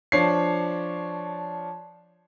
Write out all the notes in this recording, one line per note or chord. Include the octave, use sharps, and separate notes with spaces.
F3 D4 C#5 C7